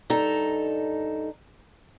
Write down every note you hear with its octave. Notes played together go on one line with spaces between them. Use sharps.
G2 D#4 A4 A#5